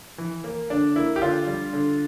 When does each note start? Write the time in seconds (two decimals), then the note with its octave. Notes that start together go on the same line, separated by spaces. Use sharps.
0.18 E3
0.44 A#3
0.70 D3 D4
0.96 A#3 E4
1.16 G4
1.22 D3 D4 F4
1.47 G3
1.73 D3